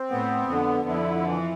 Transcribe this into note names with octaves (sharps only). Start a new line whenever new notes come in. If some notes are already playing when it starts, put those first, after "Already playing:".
Already playing: C4
A2 A3 B3
F2 D3 F3
F2 F3 E4
E3